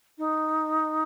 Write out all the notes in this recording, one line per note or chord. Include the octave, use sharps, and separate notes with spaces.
D#4